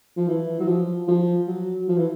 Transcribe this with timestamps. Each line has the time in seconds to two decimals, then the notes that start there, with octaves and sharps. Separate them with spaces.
0.17 F3
0.28 E3
0.60 F#3
0.68 F3
1.08 F3
1.48 F#3
1.88 F3
1.97 E3